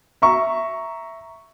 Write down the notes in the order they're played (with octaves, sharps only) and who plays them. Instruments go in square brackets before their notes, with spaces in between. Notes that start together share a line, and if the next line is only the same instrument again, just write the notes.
[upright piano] E5 A#5 C#6